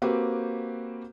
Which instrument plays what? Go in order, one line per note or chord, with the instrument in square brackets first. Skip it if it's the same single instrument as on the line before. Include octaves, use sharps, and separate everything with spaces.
[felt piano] A#3 C4 F#4 G4 B4